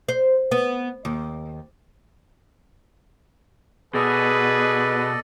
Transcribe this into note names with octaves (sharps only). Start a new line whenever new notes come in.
C5
B3
D#2
B2 G#4 A4 B4 D5 D#5